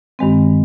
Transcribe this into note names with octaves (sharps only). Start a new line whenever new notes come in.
G2 D#3 G#3 C4